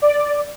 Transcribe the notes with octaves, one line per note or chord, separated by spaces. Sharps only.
D5